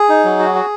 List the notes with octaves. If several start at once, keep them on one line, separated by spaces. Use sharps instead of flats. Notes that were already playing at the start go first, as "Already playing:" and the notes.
Already playing: G#4
D#4
F#3
F#4
F#4